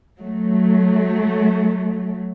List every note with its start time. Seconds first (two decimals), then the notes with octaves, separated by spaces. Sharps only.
0.19 F#3 A3